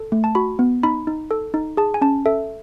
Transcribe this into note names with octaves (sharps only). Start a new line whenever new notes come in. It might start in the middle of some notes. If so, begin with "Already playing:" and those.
Already playing: A4
A3
A5
F#4 B5
B3
D#4 B5
D#4
A4
D#4
G#4 A5
G#5
C#4 A5
A4 E5